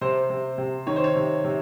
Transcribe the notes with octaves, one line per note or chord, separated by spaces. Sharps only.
C3 C5
C3
C3
D#3 C#5
C5
C#5
C3
C3